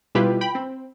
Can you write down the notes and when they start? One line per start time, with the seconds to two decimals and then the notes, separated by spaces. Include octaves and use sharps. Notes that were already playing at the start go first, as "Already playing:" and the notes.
0.15 B2 G3 E4 F4 G4 B4
0.41 G5 B5
0.55 C4